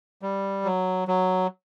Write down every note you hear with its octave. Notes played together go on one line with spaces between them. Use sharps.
G3
F#3
F#3